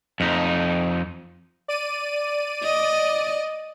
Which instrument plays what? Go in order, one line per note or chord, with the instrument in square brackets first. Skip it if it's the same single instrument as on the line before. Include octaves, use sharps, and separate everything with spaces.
[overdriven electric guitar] F2 D#4
[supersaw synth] D5 D#7
[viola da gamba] D#5